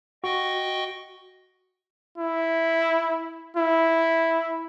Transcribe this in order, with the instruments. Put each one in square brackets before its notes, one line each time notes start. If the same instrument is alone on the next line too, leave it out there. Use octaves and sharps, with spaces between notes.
[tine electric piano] F#4 [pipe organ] D#5 G5 C#6
[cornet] E4
E4